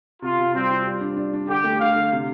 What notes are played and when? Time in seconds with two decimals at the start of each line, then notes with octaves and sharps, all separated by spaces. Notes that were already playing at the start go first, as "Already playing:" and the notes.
0.22 C3 F4
0.38 C3
0.54 G3 C4
0.71 F4
0.86 G3
1.01 D4
1.17 D4
1.33 D4
1.49 D3 G4
1.64 A3
1.80 D3 F5
1.96 D3
2.12 C3